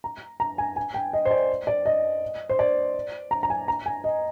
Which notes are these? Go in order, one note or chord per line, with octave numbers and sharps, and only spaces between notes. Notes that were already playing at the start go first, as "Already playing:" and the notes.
A#5
A#5
G#5
G#5
G5
D#5
C5
D5
D5
D#5
C5
D5
A#5
A#5
G#5
A#5
G#5
D#5